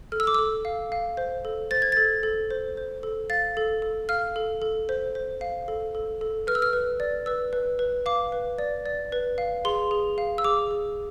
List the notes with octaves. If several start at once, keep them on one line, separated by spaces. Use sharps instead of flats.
A4 F6
E6
D6
A4 E6
F5
F5
C5
A4
C5 A6
G#6
A4 A6
A4
C5
C5
A4
F5 A6
A4
A4
F5 F6
A4
A4
C5
C5
F5
A4
A4
A4
B4 F6
E6
F6
B4
D5
B4 E6
B4
B4
F5 D6
B4
D5
D5
B4
F5
G#4 C6
G#4
F5
E6
G#4 D6
G#4